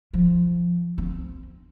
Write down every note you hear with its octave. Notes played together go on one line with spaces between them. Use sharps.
F3
C4